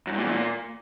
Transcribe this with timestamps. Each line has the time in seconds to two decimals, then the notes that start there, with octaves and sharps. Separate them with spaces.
0.07 F#2
0.12 G2
0.18 A#2
0.24 E2
0.29 A#2